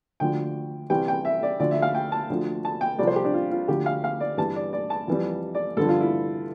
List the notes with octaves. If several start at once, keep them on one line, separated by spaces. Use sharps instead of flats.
D2 D3 F3 G5
C2 C3 E3 G3 G5
G5
E5
D5
D2 D3 F3 D5
E5
F5
G5
A5
D2 D3 F3
A5
G5
C2 C3 F3 D5
C5
G4
D4
F4
F4
D2 D3 F3 G4
F5
F5
D5
G2 E3 G3 A5
D5
D5
A5
F2 E3 G3
D5
G2 D3 F3 A4
F4
E4